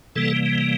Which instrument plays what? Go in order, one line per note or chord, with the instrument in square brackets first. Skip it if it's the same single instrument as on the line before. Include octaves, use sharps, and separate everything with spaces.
[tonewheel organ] C3 E3 G3 A#3 A4